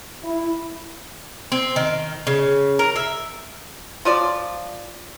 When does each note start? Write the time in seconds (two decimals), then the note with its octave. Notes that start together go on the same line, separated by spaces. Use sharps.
0.23 E4
1.52 C4
1.76 D#3
2.27 C#3
2.79 A#4
2.96 E5
4.05 F3 F4 D5